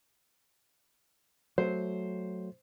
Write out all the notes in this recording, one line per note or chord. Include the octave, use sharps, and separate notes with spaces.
F#3 A3 C5